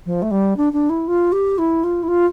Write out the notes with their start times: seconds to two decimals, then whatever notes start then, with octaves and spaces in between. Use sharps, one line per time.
0.05 F3
0.22 A3
0.31 G3
0.57 D4
0.73 D4
0.89 E4
1.07 F4
1.32 G4
1.58 E4
1.83 F4
2.03 E4
2.08 F4